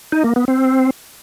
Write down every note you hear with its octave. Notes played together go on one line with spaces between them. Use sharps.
D#4
A#3
B3
C4